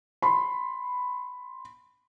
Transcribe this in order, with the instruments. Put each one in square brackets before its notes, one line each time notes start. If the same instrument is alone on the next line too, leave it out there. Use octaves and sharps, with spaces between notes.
[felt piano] B5 C6